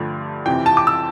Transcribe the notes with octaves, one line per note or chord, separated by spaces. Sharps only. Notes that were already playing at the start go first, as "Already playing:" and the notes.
Already playing: G2 D3 F3 A3 D4
F2 C3 E3 G5
A5
D6
E6